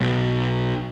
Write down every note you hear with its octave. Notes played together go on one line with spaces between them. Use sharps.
B1